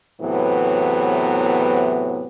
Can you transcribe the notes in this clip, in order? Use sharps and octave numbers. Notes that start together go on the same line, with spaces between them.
E2 A2 C3 E3 F#3 B3